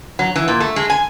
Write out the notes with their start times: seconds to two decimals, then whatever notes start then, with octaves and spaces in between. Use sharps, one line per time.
0.19 F#3
0.36 E3
0.48 A#2
0.60 A3
0.76 G#3
0.90 G#5